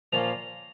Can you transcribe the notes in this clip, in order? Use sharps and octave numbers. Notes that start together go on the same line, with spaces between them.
A#2 F3 A#3 C#4 F4 A#5